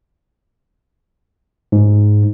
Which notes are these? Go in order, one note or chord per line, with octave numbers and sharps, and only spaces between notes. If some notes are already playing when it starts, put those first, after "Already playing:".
G#2